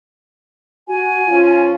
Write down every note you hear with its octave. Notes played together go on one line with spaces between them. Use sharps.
F#4 G#5
F3 C#4 F4